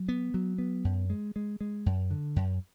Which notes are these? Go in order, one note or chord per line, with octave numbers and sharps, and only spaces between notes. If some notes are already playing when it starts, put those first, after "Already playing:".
Already playing: F#3
B3
F#3
B3
F#2
G#3
G#3
G#3
F#2
D3
F#2